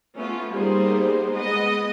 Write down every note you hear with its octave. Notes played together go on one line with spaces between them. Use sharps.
A3 B3 C#4 F4
G3 A#3 B3 D#4 G#4 C5
G#3 B3 D#5